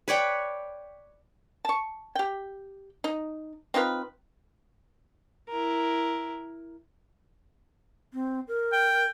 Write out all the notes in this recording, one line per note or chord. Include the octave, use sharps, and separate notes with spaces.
B4 C#5 D5 G5
A5 C#6
G4 G5
D#4
C4 D#4 F4 B4
E4 A#4
C4
A#4
G5